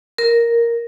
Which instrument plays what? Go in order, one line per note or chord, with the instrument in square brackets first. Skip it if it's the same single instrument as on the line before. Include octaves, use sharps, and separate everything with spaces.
[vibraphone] A#4